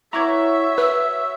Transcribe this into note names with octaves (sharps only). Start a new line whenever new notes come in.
E4 F#4 C#5 E5 A#5 D6 G#6
B4 E6